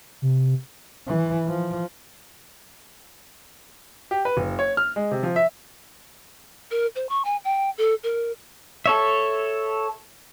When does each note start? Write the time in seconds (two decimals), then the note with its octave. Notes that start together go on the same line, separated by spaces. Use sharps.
0.22 C3
1.08 E3
1.47 F3
4.11 G4
4.25 B4
4.37 F#1
4.59 C#5
4.77 F6
4.96 G#3
5.11 C3
5.23 F3
5.36 E5
6.71 A#4
6.95 C5
7.09 C#6
7.25 G#5
7.44 G5
7.78 A4
8.03 A#4
8.86 A4 C#5 E5